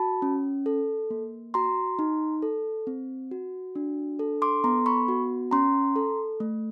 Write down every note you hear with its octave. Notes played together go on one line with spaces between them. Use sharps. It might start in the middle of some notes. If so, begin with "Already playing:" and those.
Already playing: F#4 A5 B5
C#4
A4
A#3
F#4 A#5 C6
D#4
A4
C4
F#4
D4
A4
C6 D6
B3 A#5 C6
B5 C#6
F#4
C#4 A#5 C6
A4
A3